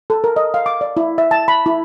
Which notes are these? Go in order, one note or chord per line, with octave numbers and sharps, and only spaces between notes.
A4
A#4
D#5
F5
D6
D5
E4
E5
A5
B5
E4